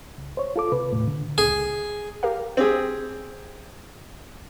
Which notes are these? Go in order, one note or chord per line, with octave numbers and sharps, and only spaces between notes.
C#2
C5 C#5
F4 A4 D6
C3 B4
D#2 A2
D3
C#2 G#4
G4 A#4 F5
C4 G4 G#4